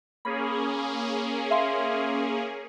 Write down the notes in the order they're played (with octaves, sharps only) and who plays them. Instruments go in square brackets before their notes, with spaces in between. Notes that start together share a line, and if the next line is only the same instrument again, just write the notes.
[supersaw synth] A#3 C#4 G#4 [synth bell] B5
[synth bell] E5 F5 C6